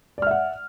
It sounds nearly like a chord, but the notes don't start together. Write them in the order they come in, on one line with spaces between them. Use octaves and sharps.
D5 F6 E5 F#5